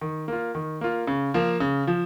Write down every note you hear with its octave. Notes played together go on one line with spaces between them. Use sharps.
D#3
A#3 F4
D#3
A#3 F4
C#3
F3 A#3
C#3
F3